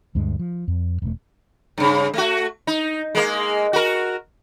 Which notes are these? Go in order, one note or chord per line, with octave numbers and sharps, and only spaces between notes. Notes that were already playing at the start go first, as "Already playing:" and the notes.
D2 G2 G#3
F3
F2
E1 A3
G2 C#3
A3 F#4
D#4
G#3 A#3
F#4 A#4